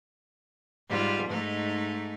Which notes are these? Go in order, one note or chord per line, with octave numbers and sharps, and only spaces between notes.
G#2 G3 F4
G#2 A3 D#4